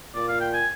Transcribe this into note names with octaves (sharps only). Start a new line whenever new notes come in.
A#2 D5
F5
G5
G#5